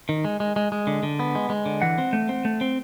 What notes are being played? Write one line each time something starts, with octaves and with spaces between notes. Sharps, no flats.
D#3
G#3
G#3
G#3
G#3
D3
D3
B3
G#3
G#3
D3
E3 F#5
C4
A3
C4
A3
C4